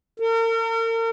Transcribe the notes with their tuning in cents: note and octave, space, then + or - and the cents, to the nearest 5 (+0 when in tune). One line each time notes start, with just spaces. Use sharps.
A#4 -40